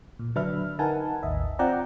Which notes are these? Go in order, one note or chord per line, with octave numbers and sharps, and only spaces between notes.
A#2
D3 F#3 D4 B4 E5 F6
D#4 A#4 B4 F#5 G#5 A5
A1 D#2 D#5 E5
C4 F4 D5 F#5 G5 A#5